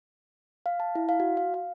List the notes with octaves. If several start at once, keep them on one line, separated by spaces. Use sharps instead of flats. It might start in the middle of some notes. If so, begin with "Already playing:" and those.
F5
A5
E4
F5
F#4
F5
F5